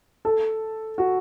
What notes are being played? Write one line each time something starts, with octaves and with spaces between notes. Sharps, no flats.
A4
F#4